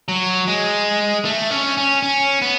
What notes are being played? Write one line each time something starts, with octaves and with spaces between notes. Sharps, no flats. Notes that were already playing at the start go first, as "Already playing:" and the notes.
F#3
G#3
A3
C#4
C#4
C#4
B3